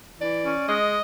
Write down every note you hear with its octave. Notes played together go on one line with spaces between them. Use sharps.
E3 D5
C#4
G#3 D#5